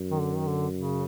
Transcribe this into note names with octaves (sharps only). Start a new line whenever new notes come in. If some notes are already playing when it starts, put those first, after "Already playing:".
Already playing: F#2
D#3
D3
D#3
D3
C#3